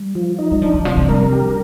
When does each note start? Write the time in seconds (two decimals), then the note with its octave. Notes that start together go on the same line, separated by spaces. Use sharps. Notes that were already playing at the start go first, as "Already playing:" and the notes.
Already playing: G3
0.15 F3
0.39 D#4
0.51 G3
0.62 F3 D4
0.74 D#3
0.85 C3 F3
0.97 F3
1.09 G3 A#4
1.32 G4